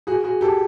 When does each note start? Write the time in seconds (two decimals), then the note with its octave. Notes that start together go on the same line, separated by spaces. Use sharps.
0.07 F#4 G#4
0.24 F#4 G#4
0.41 G4 A4